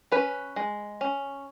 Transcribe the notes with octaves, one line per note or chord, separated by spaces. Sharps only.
C#4 B4
G#3
C#4